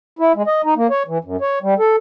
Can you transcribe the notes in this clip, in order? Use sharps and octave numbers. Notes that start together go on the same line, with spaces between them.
E4
G#3
D#5
D#4
A#3
C#5
E3
F#2
C#5
G3
A4